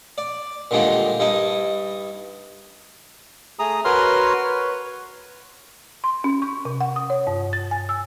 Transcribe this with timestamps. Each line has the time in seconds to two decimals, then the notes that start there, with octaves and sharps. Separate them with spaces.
0.18 D5
0.71 A#2 D3 D#3 G3 G#3 A#3
1.20 G2 D#4 E4 D#5
3.59 A3 G#4 A#5 D#6
3.85 F#4 A#4 B4 C#5 C6 F6
4.44 B4 C#5
6.04 C6
6.24 C#4
6.42 C#6
6.65 C3
6.81 F#5
6.96 D#6
7.10 C#5
7.27 G2
7.53 A6
7.71 G#5
7.89 E6